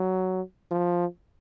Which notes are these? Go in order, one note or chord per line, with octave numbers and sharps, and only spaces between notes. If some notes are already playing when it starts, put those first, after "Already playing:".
Already playing: F#3
F3